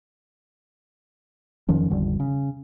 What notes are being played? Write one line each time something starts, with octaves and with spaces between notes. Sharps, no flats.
F2 D#3 F3 C#4
G#1 E2 D3 G3
C#3